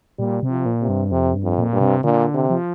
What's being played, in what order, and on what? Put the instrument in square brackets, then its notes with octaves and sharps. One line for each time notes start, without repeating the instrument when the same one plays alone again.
[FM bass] A#2 [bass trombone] G3
[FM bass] C3
[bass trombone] F3
[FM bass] A#2
[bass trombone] C3
[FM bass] G2
[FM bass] F2 [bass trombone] C3
[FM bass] G2
[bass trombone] F2
[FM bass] A#2
[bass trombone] G2
[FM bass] C3
[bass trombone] A#2 [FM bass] D3
[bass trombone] C3
[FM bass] F3